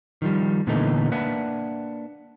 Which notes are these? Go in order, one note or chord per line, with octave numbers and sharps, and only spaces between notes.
D#3 F3 G3
A#2 D3 E3 A3 B3 D#4
A#3 D4 B4 E5 F#5